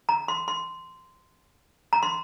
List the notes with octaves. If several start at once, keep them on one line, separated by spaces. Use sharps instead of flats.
A#5
C6
C6
A#5
C6